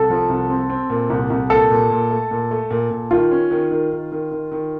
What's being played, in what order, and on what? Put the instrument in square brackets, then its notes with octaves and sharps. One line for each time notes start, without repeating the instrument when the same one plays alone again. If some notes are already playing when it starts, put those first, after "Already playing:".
Already playing: [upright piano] C2 [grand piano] A4
[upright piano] F3
C2
C4
C4
A#2
C2
C2
[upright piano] A#2 [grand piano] A4
[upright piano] A#2
A#2
A3
A#2
A3
A#2
A#2
[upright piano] D#3 [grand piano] F4
[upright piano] C#4
D#3
D#3
D#3
D#3
D#3
D#3